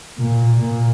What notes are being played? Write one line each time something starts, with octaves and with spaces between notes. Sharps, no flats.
A#2
A#2